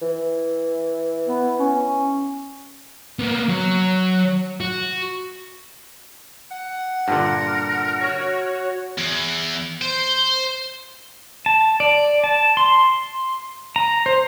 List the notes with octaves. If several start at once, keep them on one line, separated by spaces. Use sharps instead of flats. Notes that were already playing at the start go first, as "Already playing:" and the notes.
E3
B3
C#4
A#3 B3
F#3
F#4
F#5
G2 A#2 D3 A#4
F#4 C#5
E2
C5
A5
D5
A5
C6
A#5
C5